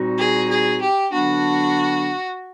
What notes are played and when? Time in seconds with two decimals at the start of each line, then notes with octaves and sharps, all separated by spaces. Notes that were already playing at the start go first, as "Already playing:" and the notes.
Already playing: A#2 G3 C4 D#4 F#4
0.18 G#4
0.49 G#4
0.81 G4
1.12 D3 F#3 B3 D4 F#4